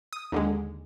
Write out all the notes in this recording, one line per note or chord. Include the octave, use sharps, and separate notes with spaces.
D#6
D#2 D3 G#3